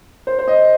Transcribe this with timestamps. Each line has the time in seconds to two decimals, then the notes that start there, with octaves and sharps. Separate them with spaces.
0.27 C5
0.39 C5
0.48 D#5